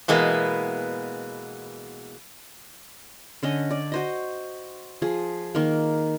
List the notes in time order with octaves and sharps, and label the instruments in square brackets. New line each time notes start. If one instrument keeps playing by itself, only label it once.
[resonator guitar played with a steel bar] B2 E3 G#3 A#3 B3
[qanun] D3 C#4 D#5
D5
F#4 C5 D#5
F3 G#4
D#3 A#3